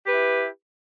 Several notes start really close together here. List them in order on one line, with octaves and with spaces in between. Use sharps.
G4 B4 E4